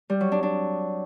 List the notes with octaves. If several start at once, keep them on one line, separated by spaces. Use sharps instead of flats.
G3
F#3
D4
D4